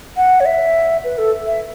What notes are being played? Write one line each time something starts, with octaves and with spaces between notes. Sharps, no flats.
F#5
C#5
E5
B4
A4
E5